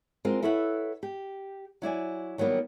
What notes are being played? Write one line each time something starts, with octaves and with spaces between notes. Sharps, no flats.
G#3 C4 F4 F#4 A#4
E4 A4 B4 C#5 E5 F#5
G4
F#3 E4 D5 G#5
D#3 F#3 G3 A#3 B3